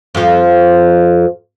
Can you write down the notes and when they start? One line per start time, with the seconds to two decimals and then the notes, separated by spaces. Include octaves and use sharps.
0.15 F2 F3